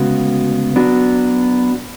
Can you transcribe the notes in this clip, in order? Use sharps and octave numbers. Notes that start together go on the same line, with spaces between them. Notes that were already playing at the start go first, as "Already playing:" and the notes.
Already playing: D2 C#3 G#3 B3 F#4
F#3 B3 D4 F#4